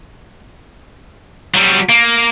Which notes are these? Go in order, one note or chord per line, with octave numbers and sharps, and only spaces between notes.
F#3 G3
A#3